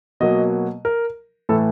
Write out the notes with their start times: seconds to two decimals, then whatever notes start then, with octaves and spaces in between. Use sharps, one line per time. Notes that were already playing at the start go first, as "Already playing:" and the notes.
0.20 B2 F#3 A#3 D#5
0.85 A#4
1.49 A2 E3 A3 A4